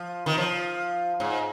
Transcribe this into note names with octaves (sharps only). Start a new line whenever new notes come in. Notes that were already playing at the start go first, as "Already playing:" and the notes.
Already playing: F3
D#3
F3
G#2